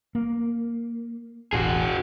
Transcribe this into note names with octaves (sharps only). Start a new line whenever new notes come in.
A#3
E1 A1 F#4 G#4